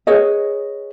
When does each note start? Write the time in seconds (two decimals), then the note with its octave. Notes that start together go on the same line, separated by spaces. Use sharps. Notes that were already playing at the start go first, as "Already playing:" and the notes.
0.07 G#4 B4 C#5 D#5